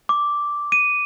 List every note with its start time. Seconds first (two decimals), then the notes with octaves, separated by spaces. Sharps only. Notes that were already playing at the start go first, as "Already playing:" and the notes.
0.09 D6
0.72 D#7